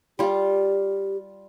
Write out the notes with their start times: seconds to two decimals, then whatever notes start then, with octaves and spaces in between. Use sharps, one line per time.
0.19 G3 F4 G4